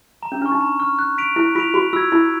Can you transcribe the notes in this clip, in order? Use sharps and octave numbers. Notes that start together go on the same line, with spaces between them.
A#5
C#4
D4 C#6 F6
D#4
A#5
C#6 F6
F#6
B6 D7 F7
E4 F#6
F4 B6 D7 F7
F#4 B5
F4 E6 G#6
E4 B5